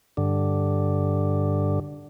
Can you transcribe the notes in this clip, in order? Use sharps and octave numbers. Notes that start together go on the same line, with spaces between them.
G2 D3